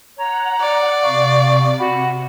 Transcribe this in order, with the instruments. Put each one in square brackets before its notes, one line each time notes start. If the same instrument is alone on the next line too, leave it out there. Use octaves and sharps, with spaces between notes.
[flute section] C#5 A#5 [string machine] F#5
[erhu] D5
[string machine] C3 [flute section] F5 C#6
[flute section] F#4 F#5 B5